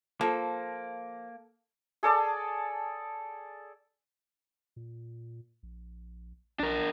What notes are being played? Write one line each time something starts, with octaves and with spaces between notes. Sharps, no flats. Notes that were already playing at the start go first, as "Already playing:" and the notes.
F3 A#3 A4
G#4 A4 D5 A5
A#2
A#1
B1 D4 A#4